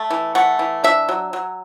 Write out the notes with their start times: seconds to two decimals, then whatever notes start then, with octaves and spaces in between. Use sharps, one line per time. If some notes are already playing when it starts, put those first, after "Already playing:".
Already playing: A3
0.10 E3
0.35 A3 F#5
0.59 E3
0.84 D4 E5
1.09 F#3
1.33 F#3